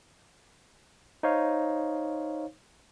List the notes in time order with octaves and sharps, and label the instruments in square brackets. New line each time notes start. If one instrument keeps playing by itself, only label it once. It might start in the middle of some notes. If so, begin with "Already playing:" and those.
[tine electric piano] D#4 C5 C#5 F5